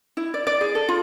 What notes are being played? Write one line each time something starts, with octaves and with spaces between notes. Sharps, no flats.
E4
D5
D5
G#4
A4
F4